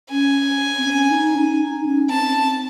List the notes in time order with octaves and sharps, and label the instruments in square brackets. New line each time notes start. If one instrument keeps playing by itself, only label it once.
[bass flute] C#4 [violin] G#5
[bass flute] C4
C#4
D#4
C#4
D#4
C#4
[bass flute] C4 [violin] A5